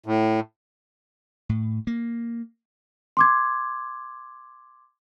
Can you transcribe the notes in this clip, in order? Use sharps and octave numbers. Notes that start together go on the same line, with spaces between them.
A2
A2
A#3
C6 D6 G#6